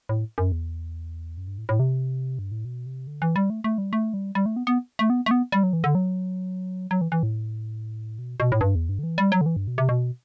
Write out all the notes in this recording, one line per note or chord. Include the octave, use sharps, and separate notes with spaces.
A2
F#2
E2
F#2
G2
A2
A2
C3
G2
A2
B2
C3
D3
E3
G3
A3
A3
G3
A3
G3
G3
A3
B3
B3
A3
B3
A3
B3
G3
F#3
E3
D3
F#3
F#3
E3
E3
A2
B2
B2
A2
G2
E2
G2
D3
E3
G3
F#3
D3
E3
G2
B2
C3
B2